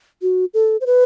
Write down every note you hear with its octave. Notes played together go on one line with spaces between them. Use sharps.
F#4
A4
C5
B4